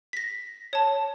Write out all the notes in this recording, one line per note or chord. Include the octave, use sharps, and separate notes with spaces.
A#6 B6
C#5 A5